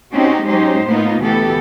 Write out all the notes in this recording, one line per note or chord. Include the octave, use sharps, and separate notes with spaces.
C4 C#4 D#4 F#4 G4
F#3 G#3 C#4 D#4 G4 C5
A2 A#3 B3 D#4 F4
D2 B2 E3 B3 G4 A4